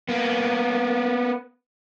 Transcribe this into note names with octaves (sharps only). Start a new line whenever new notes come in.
A#3 B3